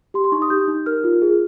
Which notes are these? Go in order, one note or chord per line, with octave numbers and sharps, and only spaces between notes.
G4 C6
C6
D#4 C#6
D#6
G4 G6
D#4
A#4 F6
F4
G#4